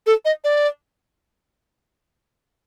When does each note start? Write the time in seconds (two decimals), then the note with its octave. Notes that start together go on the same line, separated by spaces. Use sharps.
0.06 A4
0.25 D#5
0.44 D5